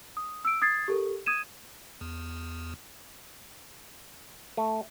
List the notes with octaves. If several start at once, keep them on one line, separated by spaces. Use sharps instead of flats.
D#6
E6 D7
D#6 G#6 A6 C7
G4 A4 A#4
D#6 G#6 D#7 E7
E2
A3